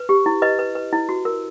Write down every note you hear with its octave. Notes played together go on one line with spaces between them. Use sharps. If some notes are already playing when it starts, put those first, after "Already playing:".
Already playing: B4
G4
E4
B4 D#5
B4
B4
E4
F#4
A#4